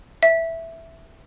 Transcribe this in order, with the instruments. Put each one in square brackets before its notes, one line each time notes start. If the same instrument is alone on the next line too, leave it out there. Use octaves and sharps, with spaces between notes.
[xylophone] E5